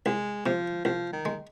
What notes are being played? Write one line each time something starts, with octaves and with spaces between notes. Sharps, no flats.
C2 G#3
C3 F3
C2 F3
D#3
G#3